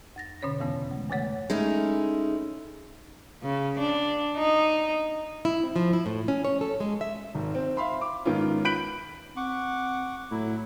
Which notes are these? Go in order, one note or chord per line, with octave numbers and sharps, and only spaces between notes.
F2 A6 A#6
B2 D3 C#4 C#5 A6 A#6
E2 G2 C#3 E3 B3 C#4
G#3 A3
G2 C#3 E3 A3 C#5 F#5
G#3 A3 C#4 D#4 E4
C#3
D4
D#4
E4
C4
F3
E4
A2
C#4
C#5
A4
G#3
E5
G#1
C4
E5 F5 B5 C6
D6
G#2 D#3 B3 C#4 F4
B5 F#6 G6 B6 D7 F#7
C4 F#5 C#6 D6
A2 F#3 E4